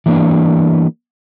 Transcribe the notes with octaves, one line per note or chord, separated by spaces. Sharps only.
E3 G3 A#3 B3 D4